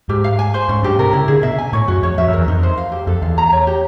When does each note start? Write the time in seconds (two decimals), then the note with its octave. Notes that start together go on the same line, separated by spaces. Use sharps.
0.09 G#2 G4
0.24 F5
0.39 G#5
0.54 C5
0.69 G#2 C#4
0.83 G2 G4
0.99 C3 A#4
1.13 C#3 E4
1.28 D3 G#4
1.43 B2 E5
1.58 G#5
1.73 A2 C#5
1.88 F#2 F#4
2.03 F2 C#5
2.18 F2 E5
2.28 F2
2.33 E2 A#4
2.48 F2 D#4
2.63 C5
2.77 F5
2.92 G4
3.07 F2 A4
3.22 E2 F5
3.38 A#5
3.52 C#5
3.67 G4